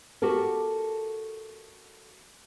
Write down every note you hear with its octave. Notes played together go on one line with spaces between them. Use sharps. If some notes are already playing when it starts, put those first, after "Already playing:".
F#4 G4 A4 A#4